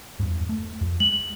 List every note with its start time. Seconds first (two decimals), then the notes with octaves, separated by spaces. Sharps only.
0.20 E2 G2
0.49 A3
0.81 F2
1.00 G#3 F#7